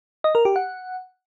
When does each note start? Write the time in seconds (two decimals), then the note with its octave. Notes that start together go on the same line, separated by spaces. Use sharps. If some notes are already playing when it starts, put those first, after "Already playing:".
0.24 D#5
0.35 A#4
0.45 G4
0.56 F#5